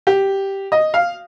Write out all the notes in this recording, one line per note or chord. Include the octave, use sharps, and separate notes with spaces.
G4
D#5
F5